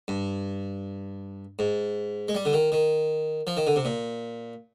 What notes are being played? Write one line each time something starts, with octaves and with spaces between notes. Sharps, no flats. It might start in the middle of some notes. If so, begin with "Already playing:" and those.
G2
G#2
G#3
G3
D3
D#3
D#3
F3
D#3
D3
C3
A#2